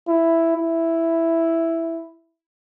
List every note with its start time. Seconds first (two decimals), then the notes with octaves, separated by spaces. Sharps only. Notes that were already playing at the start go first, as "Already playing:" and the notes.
0.08 E4
0.56 E4